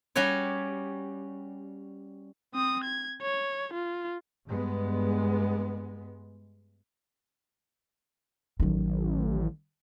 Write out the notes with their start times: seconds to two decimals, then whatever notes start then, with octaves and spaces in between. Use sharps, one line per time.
0.16 G3 C#4 F#4 G4 C#5
2.54 C4 D#6
2.84 G#6
3.21 C#5
3.73 F4
4.47 G2 G#3 B3
8.60 A1 D#3 F#3